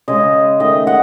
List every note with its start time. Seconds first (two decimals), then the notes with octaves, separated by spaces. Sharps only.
0.08 C#3 G#3 D#5
0.60 D#3 A3 D#5
0.87 F#5